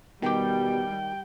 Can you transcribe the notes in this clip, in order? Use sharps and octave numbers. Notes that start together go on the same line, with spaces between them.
B2 D#3 G3 G4 G5